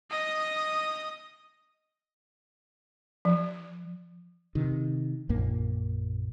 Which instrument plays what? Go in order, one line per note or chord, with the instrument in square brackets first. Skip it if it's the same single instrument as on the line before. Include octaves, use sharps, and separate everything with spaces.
[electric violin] D#5 D#6
[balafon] F3
[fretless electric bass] C3 D#3
A#1 F#2 A#2 A#3